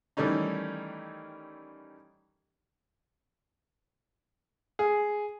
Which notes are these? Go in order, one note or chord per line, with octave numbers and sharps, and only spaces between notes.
D#3 E3 G3 A3 C#4 D#4
G#4